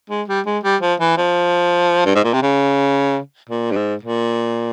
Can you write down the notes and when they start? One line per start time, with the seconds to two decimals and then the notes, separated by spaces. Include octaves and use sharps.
0.10 G#3
0.28 G3
0.46 G#3
0.64 G3
0.82 F3
1.00 E3
1.18 F3
2.06 G2
2.15 G#2
2.24 A#2
2.34 C3
2.43 C#3
3.50 A#2
3.71 G2
3.76 G#2
4.04 A#2